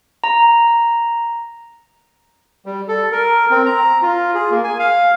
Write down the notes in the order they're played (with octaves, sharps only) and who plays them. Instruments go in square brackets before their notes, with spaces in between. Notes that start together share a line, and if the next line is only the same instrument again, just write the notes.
[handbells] A#5
[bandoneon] G3
A4
A#4
C4
A#5
F4
G#4
A#3
G#5
F5